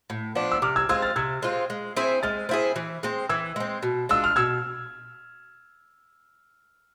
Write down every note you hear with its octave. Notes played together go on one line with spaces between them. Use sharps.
A2
F3 B3 D4
E6
C3 D6 F6
E6 G#6
G#3 C4 F4 E6 G#6
F6 A6
C3 E6 G#6
G#3 C4 F4
G#3
C4 E4 G#4
G#3 F6 A6
C4 E4 G#4
E3
G#3 C4
E3 E6 G#6
G#3 C4
B2
G#3 D4 F4 E6
F6
B2 E6 G#6